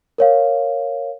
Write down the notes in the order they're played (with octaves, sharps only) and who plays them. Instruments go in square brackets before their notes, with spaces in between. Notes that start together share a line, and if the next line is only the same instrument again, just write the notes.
[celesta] A#4 C#5 F5